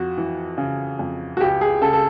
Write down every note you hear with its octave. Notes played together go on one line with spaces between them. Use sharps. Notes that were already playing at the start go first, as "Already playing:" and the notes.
Already playing: F2 F#4
E3
C#3
F2
F#4
C#2 G4
G#4
C#3 A4
A4